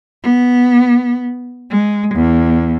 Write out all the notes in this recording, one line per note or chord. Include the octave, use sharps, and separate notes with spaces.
B3
G#3
E2